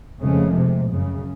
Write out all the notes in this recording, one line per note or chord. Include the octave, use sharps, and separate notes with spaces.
F1 C#3 F3 G#3 A3
C3
F#2 C#3